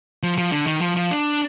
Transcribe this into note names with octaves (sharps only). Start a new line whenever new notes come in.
F3
F3
D3
D#3
F3
F3
D4